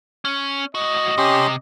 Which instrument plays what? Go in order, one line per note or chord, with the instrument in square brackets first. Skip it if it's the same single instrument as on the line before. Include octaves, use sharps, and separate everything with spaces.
[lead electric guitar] C#4
[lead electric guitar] A2 F#4 [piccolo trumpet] D#5
[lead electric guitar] C3 [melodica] C#4 G4 C6